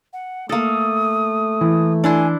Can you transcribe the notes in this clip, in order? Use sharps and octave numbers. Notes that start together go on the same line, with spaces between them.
F#5
A3 A#3 A4 D#6
E3
D4 E4 G#5 C6